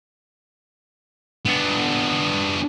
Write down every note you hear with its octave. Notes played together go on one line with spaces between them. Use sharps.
B3 D4